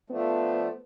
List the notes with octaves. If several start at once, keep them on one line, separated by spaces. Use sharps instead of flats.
F3 A3 B3 D4